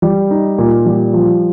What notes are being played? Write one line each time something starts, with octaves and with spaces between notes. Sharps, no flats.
G3
D#4
A#2
G3
F3